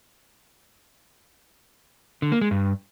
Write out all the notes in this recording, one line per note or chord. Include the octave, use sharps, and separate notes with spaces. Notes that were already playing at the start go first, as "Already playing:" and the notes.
D3
A#3
G#3
G2